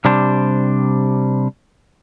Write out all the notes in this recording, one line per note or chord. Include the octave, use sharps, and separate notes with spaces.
C3 G3 D4 C5